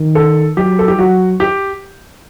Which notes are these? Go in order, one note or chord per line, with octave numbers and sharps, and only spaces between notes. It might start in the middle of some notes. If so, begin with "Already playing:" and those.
Already playing: D#3
A4
F#3 G4
A4
G4
F#3 F#4
G4